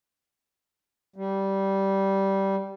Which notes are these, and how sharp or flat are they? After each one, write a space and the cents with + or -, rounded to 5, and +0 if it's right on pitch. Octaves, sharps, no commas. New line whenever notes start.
G3 -10